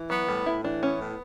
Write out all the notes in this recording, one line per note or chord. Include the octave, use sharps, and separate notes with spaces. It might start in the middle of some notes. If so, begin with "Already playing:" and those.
Already playing: E3
F#3 B3
A2 G3
A2 E4
E3 D4
B3 C#4
A2